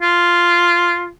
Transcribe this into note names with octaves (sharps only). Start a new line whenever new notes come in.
F4